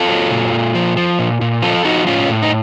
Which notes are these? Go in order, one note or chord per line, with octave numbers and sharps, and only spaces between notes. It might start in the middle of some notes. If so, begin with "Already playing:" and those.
Already playing: F4 A4
F#3
A#2
A#2
F3
F3
A#2
A#2
F3 F4 A4
F3 D#4 F#4
A2 C#4 F4
A2
D#4